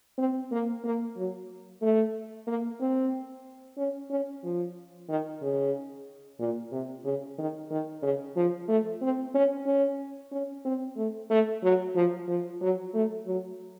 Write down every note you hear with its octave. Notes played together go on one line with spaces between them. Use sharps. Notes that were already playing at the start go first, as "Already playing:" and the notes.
C4
A#3
A#3
F#3
A3
A#3
C4
C#4
C#4
F3
D#3
C#3
A#2
C3
C#3
D#3
D#3
C#3
F3
A3
C4
C#4
C#4
C#4
C4
A3
A3
F#3
F3
F3
F#3
A3
F#3